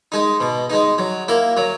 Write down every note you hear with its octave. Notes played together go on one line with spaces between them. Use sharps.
G#3 D#4
B2
G#3 D#4
F#3
A#3 E4
F#3